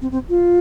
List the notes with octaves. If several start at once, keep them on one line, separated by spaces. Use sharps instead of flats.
C4
C4
F4